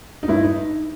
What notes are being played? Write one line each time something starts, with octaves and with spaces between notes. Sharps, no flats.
D#4
G2 E4
D#4